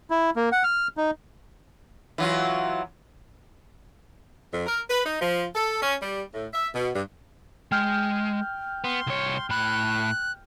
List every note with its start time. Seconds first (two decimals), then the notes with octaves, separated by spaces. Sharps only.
0.10 E4
0.36 A#3
0.52 F#5
0.64 F6
0.97 D#4
2.18 E3 F#3 F4
4.52 F2
4.66 A#4
4.90 B4
5.05 D#4
5.21 F3
5.55 A4
5.82 C#4
6.02 G3
6.33 A2
6.53 E5
6.75 B2
6.94 G2
7.72 G#3 G5 F6 G6
8.84 B3 C6
9.07 C2 C#5
9.50 A2 B5 F#6